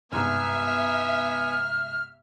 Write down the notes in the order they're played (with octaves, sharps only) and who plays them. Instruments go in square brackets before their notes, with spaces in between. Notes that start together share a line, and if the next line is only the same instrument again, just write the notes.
[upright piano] G1 C2 G#2 [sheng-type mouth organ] B3 G#5 [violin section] E5 [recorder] F6